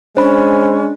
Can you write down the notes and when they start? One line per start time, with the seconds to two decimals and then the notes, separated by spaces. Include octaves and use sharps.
0.17 G#3 C#4 D4 C5 B5